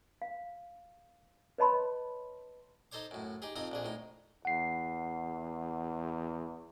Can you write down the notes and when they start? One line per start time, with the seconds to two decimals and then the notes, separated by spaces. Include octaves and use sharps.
0.22 F5
1.58 B4 C#5 D#5 A5 B5 C6
2.92 D#4 A4 C5 C#5 D6
3.11 F#2 A2
3.42 D#4 G4 G#4
3.56 F2 C4 D#4 A#5 D#6
3.72 A#1 D3 G#4
3.85 A2 D#4
4.45 E2 F#5 C7